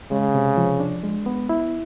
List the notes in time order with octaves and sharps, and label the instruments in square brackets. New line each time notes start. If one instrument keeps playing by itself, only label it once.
[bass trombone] C#3 [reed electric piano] G#3
[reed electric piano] C3
F3
D4
G#3
B3
E4